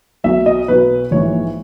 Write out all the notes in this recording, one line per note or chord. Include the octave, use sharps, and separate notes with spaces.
B1 B2 F#3 E5
D#5
B1 B2 F#3 B4
A#1 G#2 E3 C#5